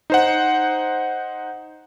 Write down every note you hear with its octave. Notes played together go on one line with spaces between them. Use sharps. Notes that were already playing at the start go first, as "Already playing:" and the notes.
D#4 C5 F#5